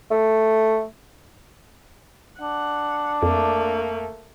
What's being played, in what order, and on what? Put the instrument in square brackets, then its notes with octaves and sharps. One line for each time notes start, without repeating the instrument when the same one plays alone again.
[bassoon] A3
[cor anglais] D4 [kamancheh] F#5
[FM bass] F2 [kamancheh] A3 A#3